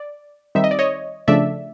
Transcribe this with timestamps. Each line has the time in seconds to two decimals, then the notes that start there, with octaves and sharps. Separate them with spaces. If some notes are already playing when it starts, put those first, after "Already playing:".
Already playing: D5
0.55 D#3 G3 C4 D#4 E5
0.64 D#5
0.71 D5
0.79 C#5 D#5
1.28 C#3 F3 A3 D4 D5 E5